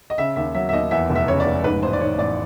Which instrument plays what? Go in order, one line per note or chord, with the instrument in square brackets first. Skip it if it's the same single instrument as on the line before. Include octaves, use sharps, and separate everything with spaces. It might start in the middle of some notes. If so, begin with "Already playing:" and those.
[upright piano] D#5
C#3 E5
D#2 E5
F#3 E5
E5
D#2 D#5
E2 E5
F1
E5
C#3 C#5
D5
F1
G#2 B4
A1 C5
D5
D#3 C#5
A1 D5